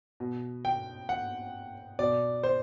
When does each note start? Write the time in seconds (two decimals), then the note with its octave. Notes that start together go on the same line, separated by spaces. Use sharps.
0.20 B2
0.65 G5
1.09 F#5
1.99 B2 D5
2.43 C5